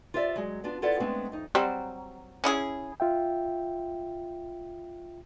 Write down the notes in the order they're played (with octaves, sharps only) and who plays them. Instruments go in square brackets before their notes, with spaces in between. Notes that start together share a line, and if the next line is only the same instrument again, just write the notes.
[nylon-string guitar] F4 G4 C5 D5 E5
F#3 G#3
B3 D4 F4
E4 F4 A4 B4 D5 F#5
G#3 A3 B3 C4 D4
F2 D#4
[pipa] F#3 [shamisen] G3 C4
[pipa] C#4 E4 G#4
[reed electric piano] F4 E5 G5